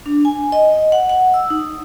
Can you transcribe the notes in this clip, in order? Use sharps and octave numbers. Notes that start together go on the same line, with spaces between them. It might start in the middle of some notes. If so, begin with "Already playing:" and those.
D4
G#5
D#5
F#5
F#5
E6
D#4